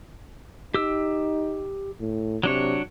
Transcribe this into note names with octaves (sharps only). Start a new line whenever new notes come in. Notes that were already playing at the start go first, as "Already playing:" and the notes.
D#4 G4 E6
A2
C3 F#3 D4 C#5